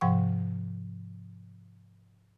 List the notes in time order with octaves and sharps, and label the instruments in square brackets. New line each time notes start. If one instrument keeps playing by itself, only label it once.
[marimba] G#2 C3 F3 F#5 G5 C#6